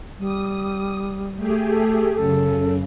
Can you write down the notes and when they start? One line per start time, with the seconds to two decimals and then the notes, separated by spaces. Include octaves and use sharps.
0.19 G3 D#6
1.36 A3 G4 G#4
1.70 A4
2.15 F#2 C#3 A4